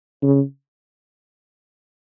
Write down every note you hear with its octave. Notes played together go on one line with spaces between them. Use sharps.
C#3